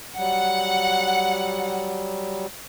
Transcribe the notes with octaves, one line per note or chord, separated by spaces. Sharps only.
F#3 G3 F#5